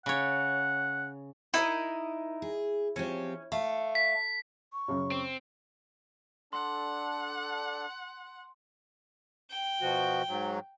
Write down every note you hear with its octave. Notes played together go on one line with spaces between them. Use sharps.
C#3 C#5 F#5
D#4 E4 A#4 D#5
G#4
F3 C4 C#4 G4
A3 F5
B6
C#6
F#2 C#3
C4
D4 A4 F#5 C6
G5
B2 F3 F#4
G#2 F#3